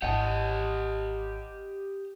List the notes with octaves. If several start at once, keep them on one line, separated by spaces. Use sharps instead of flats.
G#1 E4 G4 D#5 F#5 G#5 A5